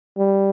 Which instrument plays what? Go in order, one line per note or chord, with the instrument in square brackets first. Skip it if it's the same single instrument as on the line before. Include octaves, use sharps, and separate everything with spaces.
[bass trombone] G3